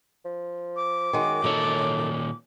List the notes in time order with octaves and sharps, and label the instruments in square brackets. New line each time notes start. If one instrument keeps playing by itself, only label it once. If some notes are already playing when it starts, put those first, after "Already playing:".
[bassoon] F3
[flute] D6
[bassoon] F#2 [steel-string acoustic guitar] D#3 G#3 F#4
[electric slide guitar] A#2 D#3 C#5 [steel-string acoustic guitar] D#4 A4